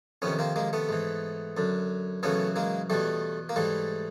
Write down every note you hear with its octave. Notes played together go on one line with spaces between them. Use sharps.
F2 C3 D#3 B3 C#4
A#3 C4
G#3 A#3
A3 B3
G#2 E3
F#2 D3
F#2 C#3 E3 A3 B3
G#3 A#3
E2 B2 G3 A3
A#3
G#2 E3 G3 A3